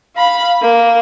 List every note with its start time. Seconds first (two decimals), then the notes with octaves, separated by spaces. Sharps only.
0.16 F5 B5
0.62 A#3